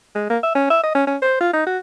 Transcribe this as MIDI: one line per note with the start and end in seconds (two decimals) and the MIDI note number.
0.15 0.26 56
0.30 0.38 58
0.43 0.54 76
0.55 0.67 61
0.70 0.79 76
0.83 0.94 75
0.95 1.04 61
1.07 1.17 61
1.22 1.37 72
1.41 1.50 65
1.53 1.66 63
1.66 1.78 66